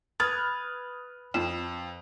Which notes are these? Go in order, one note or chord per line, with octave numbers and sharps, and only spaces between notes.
B4 D#6 F6 G#6 A6
F2 E7